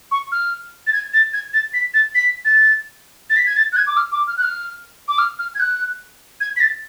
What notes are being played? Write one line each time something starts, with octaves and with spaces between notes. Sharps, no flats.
C#6
F6
A6
G#6
A6
G#6
A6
B6
A6
B6
A6
A6
B6
G#6
A6
F#6
G#6
D6
F6
D6
F6
F#6
F6
D6
F6
F6
G#6
F#6
G#6
B6
A6